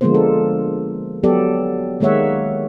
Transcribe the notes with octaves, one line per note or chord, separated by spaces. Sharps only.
D3 F3 G#3 A#3 B3 C5
A4
F#3 B3 G4 A4 D5
D#3 G#3 A#3 C#5 E5 F#5